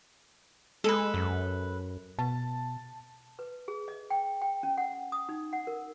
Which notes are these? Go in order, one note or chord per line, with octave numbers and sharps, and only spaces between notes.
G#3 A4 B4
F#2
B2 A5
B4
G#4
D#5
G5
G5
C#4
F#5
D#6
D#4
F#5
A#4